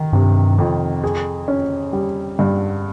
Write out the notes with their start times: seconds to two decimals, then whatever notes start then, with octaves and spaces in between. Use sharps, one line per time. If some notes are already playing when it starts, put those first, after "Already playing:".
Already playing: D#3
0.12 G2 C3
0.59 F2
1.04 G#4
1.48 C#4
1.93 G3
2.39 G2